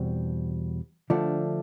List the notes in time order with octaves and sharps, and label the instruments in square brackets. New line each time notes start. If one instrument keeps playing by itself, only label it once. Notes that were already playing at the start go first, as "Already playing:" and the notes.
Already playing: [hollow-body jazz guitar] E2 B2 G3 C4
D3 F3 A3 D4